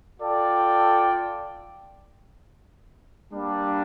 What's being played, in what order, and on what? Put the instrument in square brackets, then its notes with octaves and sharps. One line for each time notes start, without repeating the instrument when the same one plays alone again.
[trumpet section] F4 A4 D5 G5
G3 A#3 D4